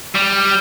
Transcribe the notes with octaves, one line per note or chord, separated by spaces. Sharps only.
G3